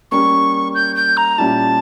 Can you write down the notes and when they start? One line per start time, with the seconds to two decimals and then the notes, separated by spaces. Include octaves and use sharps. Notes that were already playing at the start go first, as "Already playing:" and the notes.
0.11 G3 A#3 C#4 C#6
0.75 G6
0.96 G6
1.17 A#5
1.38 A#2 G3 C#4 E4 A5